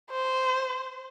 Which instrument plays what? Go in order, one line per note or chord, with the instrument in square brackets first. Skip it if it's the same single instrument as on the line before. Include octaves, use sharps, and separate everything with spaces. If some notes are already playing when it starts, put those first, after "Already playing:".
[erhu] C5